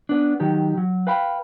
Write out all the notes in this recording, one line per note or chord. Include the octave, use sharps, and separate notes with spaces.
B3 D4
D#3 F#3 G4
F#3
B4 F5 G5 B5